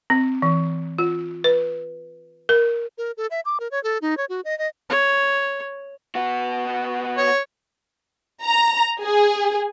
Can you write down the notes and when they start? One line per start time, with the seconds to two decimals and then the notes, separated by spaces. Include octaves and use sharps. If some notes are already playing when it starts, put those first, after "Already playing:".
0.10 C4
0.42 E3
0.98 F4
1.44 B4
2.49 A#4
2.98 A#4
3.17 A4
3.31 E5
3.45 D6
3.60 A#4
3.71 C#5
3.83 A4
4.02 D#4
4.17 C#5
4.29 F#4
4.45 D#5
4.58 D#5
4.89 C#5
6.15 B3 F#4
7.17 C#5
8.44 A#5
9.01 G#4